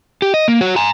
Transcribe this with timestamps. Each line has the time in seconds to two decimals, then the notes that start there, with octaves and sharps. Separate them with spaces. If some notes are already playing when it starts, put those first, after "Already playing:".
0.22 G4
0.34 D#5
0.48 A#3
0.61 F#4 C#5
0.76 G#5 A#5